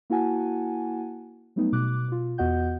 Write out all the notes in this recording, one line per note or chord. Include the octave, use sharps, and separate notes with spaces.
A#3 E4 F#4 F#5 G#5 A5
F#3 G3 A3 B3 D#4
B2 D6 F#6
B2 F4
E2 B3 F#4 D#5 F#5 G6